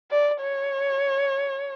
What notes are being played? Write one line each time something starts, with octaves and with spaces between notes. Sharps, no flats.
D5
C#5